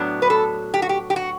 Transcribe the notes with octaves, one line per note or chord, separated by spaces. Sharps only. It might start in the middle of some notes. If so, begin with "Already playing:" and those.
Already playing: A2 F#3 B3 D4
B4
A4
G4
F#4
G4
G4
F#4